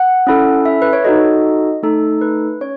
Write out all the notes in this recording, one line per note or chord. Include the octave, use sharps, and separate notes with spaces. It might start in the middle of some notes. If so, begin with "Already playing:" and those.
Already playing: F#5
C#4 E4 A4
E5
B4
C#5
D#4 F#4 A4 D#5
A3 D#4 A4
B4
C#4 C#5